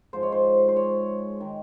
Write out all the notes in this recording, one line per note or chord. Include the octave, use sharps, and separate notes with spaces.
G#2 F3 G#3 C5
C#5
C5
C5
C#5
D#3 G#3